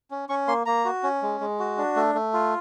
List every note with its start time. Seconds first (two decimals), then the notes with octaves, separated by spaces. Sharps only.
0.11 C#4
0.29 C#4 C#6
0.48 A#3 C6
0.66 A#3 A#5
0.85 F#4
1.03 C#4
1.22 G#3
1.40 G#3
1.59 F#4
1.78 D4
1.96 A3
2.15 A3
2.34 F4